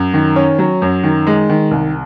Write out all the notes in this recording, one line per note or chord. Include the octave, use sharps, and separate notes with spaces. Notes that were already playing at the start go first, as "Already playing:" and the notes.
Already playing: F#2
D#3
C#4
F#3
F#2
D#3
G#3
D#3
C2